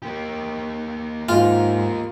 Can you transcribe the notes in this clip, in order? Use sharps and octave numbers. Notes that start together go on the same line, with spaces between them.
A#3 G4
G#2 F4